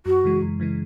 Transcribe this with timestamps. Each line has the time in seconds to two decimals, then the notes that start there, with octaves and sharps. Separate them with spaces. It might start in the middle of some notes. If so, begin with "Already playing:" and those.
0.06 F#2 F#4
0.24 C#3 E3 G#3
0.42 F#2
0.60 C#3 E3 G#3